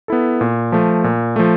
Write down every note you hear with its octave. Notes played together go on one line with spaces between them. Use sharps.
B3 E4 A4
A#2
F3 A3
A#2
F3 A3